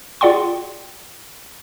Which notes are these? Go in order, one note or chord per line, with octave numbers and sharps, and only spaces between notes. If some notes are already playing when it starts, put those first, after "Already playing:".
F4 G#4 D5 F#5 G5 C6